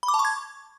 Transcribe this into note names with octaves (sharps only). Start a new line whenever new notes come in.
B5
D6
A5
C#6
G#6